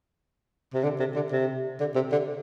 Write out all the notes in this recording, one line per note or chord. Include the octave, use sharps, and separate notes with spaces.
C3
D3
C3
D3
C3
D3
C3
D3